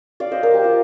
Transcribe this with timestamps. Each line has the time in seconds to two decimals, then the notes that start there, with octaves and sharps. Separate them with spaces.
0.20 D5 F5
0.32 C5 D#5
0.43 A#4 D5
0.54 G4
0.64 F4